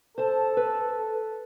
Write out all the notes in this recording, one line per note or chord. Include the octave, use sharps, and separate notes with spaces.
A4 C5 A5
B4